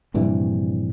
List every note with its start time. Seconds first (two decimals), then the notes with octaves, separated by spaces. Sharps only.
0.14 A#1 G2 C3 E3